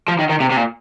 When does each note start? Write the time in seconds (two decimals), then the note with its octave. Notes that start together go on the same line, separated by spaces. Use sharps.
0.08 F3
0.19 D#3
0.30 D#3
0.40 C3
0.50 C3
0.57 A#2